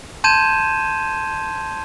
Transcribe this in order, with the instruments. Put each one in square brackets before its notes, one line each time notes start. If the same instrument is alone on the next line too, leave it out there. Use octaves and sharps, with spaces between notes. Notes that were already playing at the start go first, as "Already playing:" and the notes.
[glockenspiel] A5 C6 G6 G#6 D#7 E7